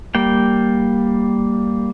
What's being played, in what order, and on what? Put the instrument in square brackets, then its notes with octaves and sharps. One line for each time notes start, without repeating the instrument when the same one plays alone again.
[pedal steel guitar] G3 A#3 G5